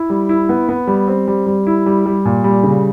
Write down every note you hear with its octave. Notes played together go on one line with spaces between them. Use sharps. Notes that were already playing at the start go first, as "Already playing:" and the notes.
Already playing: E4
G3
E4
B3
B3
G3
C4
G3
G3
E4
G3
G3
A#2
G3
C#3